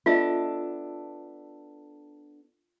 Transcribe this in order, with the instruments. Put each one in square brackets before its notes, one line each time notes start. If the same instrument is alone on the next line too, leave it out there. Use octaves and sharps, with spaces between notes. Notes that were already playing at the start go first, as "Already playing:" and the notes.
[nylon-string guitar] B3 D4 A4 [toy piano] F4 D#5 E5